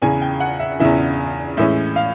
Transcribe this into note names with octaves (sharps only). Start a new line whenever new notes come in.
E2 C#3 E3 G#5
G5
F#5
E5
E2 C#3 E3 E5
A2 E3 G#3 C#4 E5
F5